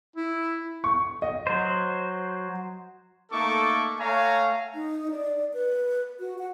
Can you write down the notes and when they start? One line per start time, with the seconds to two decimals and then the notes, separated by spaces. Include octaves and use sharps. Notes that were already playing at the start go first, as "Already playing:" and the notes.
0.16 E4
0.84 C#6
1.22 D#5
1.47 F#3 C5
3.31 A3 A#3 D#4 A4 C#6 D6
3.99 A3 C#5 F5 F#5 G#5 A#5
4.75 D#4
5.11 D5
5.53 B4
6.20 F#4
6.38 F#5